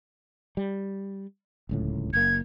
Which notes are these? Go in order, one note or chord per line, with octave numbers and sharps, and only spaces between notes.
G3
D1 C#2 A2
F#1 A#3 G#6